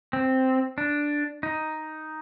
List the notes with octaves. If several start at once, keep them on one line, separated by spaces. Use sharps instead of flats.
C4
D4
D#4